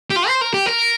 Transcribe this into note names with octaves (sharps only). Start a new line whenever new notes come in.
G4
F4
C5
A#4
G4
A#4